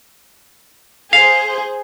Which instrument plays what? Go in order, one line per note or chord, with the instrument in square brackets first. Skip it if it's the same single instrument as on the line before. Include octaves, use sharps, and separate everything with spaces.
[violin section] G#4 C5 [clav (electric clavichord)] F5